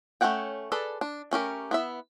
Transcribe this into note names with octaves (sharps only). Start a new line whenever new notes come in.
A3 C#4 C#5 F#5 G5
G#4 A4 B4 D5
D4
A3 C#4 G4 A#4
B3 E4 E5